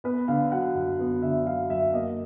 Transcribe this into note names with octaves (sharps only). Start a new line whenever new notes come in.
B3 B4
D3 F5
F#3 F#5
F#2
B3
D3 E5
F#3 F5
F#2 E5
A#3 D#5